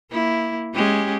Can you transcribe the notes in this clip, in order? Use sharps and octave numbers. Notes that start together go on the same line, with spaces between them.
A#3 E4
G#3 C#4 G4